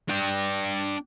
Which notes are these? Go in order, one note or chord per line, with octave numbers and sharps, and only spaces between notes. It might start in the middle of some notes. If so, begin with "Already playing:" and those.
D4 G5